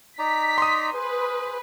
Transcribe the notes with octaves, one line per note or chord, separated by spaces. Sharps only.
D#4 D5 A#5 B6
C6 D#6
G#4 B4 C5